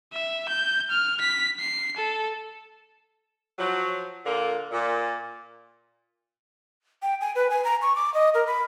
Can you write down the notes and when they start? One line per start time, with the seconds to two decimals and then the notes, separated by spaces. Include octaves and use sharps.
0.12 E5
0.48 G6
0.90 F6
1.20 B6
1.60 C7
1.96 A4
3.59 F3 F#3
4.25 A#2 D3 A#3
4.71 A#2
7.02 G5
7.21 G#5
7.36 B4
7.50 G#5
7.64 A#5
7.82 C#6
7.96 D6
8.14 D#5
8.34 A#4
8.47 B5